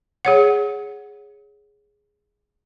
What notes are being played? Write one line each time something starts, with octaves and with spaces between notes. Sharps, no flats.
G#4 C#5 F#5